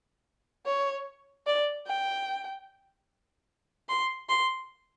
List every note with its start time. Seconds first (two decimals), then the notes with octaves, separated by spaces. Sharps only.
0.66 C#5
1.47 D5
1.87 G5
3.89 C6
4.29 C6